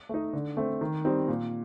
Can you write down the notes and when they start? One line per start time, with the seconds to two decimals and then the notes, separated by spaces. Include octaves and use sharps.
0.09 A3 D#4
0.33 D3
0.57 A3 C4
0.81 D#3
1.05 G3 C4 D#4
1.28 A#2